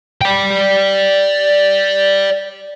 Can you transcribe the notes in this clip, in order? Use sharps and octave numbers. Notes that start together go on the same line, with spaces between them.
D5 G5